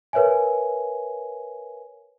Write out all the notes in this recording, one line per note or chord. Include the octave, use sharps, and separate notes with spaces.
A#4 B4 C#5 E5 G#5